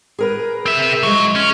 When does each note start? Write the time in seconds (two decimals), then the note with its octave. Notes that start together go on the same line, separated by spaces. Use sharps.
0.19 G#4 A#4 B4
0.66 C4 E5
1.03 F3 F#3 G#3
1.36 C#4